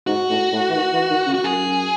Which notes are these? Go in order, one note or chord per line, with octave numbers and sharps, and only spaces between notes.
G#2 F#4
A2
A2
E3
D#3
E3
D#3
C#3
F#4
F#2 G#4